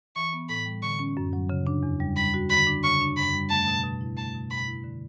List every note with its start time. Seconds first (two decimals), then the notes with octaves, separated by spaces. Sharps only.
0.16 E3 C#6
0.33 B3
0.49 A2 B5
0.66 G3
0.82 D3 C#6
0.99 C#4
1.17 F#2
1.33 F#3
1.50 C#3
1.67 D4
1.83 E2
2.00 G3
2.16 G3 B5
2.34 F#4
2.50 D3 B5
2.67 D4
2.83 C#3 C#6
3.01 D4
3.17 F#2 B5
3.33 G3
3.50 A3 A5
3.68 B2
3.84 B2
4.01 E4
4.17 A3 A5
4.34 B2
4.50 B2 B5
4.67 E4
4.84 D3